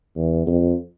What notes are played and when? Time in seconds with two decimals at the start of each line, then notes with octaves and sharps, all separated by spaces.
0.16 E2
0.47 F2